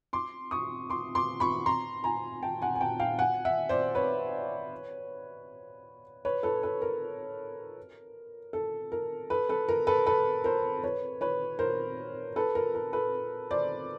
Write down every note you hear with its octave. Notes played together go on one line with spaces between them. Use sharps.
C6 D6
C#6 D#6
C6 D6
C6 D6
B5 C#6
A#5 C6
G#5 A#5
G5 A5
F#5 G#5
G#5
G5 A5
F5 G5
F#5 G#5
E5 F#5
C5 D5
B4 C#5
B4 C#5
A4 B4
A4 B4
A#4
A4
A#4
A4 B4
A4 B4
A#4
A4 B4
A4 B4
A#4 C5
B4 C#5
B4 C#5
A#4 C5
A4 B4
A#4
A#4
A4 B4
C5 D5